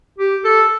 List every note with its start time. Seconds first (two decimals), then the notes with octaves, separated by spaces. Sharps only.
0.19 G4
0.44 A4